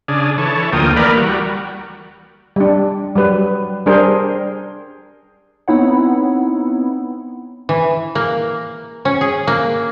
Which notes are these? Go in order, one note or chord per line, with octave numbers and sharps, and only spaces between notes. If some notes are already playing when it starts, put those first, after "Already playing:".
C#3 D4 G#4
E3 A4 C#5
D2 F3 A#3 G5 D#6
E3 A#3 A#4 B4 D5
G3 F#4
G3 D4
F#3 G3 B4
G3 D4 G#4 A#4 C5
B3 C4 D#4 E4 C#5 F#5
E3
A#3
C#4
G#4
A#3